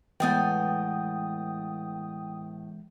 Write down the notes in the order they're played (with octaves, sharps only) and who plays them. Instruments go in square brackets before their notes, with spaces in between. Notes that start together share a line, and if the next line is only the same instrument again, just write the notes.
[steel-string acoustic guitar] A2 B3 G#5 [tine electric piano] E3 G#3 G6 [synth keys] G5 D#6